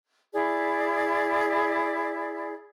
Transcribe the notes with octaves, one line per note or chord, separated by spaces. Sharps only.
E4 G#4 D5